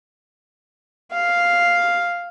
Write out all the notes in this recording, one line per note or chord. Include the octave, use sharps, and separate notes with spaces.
F5